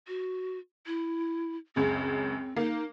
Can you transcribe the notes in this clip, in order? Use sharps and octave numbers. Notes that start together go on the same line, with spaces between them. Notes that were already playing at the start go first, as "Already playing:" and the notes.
F#4
E4
C#2 F#2 C#3 C4
A#3 D#4